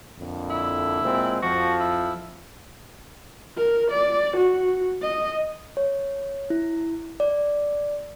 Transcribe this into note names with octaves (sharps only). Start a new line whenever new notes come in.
F2 A#2 D3
E4
A#2 G#3 C4
F2 F3 F#4
E4
A#4
D5
F#4
D#5
C#5
E4
D5